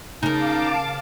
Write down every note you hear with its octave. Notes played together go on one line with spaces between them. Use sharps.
C#3 D#4 A#4 F5 A5 D6